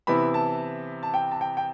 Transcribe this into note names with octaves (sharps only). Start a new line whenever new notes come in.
C3 E3 B3 E4 B5
A5
A5
G5
A5
G5
G5